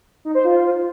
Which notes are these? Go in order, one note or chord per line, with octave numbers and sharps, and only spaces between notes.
D#4
C5
F4